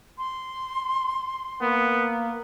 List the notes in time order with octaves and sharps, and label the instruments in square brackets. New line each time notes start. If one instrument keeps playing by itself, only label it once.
[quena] C6
[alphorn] A#3 [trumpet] B3